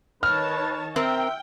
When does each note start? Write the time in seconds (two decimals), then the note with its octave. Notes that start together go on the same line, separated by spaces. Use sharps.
0.23 D#3 B4 C#5 A5 F6
0.96 C4 A#4 E5 G5